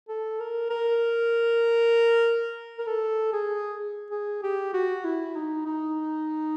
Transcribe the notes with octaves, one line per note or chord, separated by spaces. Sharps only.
A4
A#4
A#4
A#4
A4
G#4
G#4
G4
F#4
E4
D#4
D#4